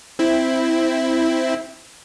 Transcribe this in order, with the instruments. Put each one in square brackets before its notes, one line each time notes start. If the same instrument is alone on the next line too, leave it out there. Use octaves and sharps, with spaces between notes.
[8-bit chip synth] C4 E4